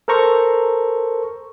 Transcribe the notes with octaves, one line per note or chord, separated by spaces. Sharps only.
A4 A#4 C5 A#5 C#6